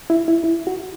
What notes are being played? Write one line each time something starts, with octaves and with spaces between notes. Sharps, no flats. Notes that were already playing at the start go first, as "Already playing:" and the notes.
E4
E4
E4
F#4